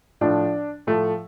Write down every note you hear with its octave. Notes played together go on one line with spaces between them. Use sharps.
A2 F3 D4
A2 F3 A3